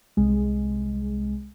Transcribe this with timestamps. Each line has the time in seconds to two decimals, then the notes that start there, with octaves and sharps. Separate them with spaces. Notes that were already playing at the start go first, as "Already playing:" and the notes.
0.17 C2 G#3